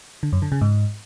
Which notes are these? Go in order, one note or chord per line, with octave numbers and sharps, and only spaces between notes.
D3
F#2
D3
C#3
G#2